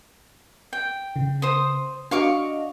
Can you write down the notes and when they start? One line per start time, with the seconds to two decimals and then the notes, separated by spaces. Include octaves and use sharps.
0.73 G5
1.16 C#3
1.42 C5 D#6
2.11 D4 F#4 D#5 F5 C#6 D6